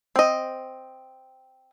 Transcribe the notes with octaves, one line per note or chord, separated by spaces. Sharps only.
C4 D#5